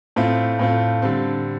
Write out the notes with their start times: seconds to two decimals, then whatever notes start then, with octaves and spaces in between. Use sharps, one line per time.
0.16 A2 A3 C4 F4
0.59 A2 A3 C4 F4
1.02 D3 G3 C4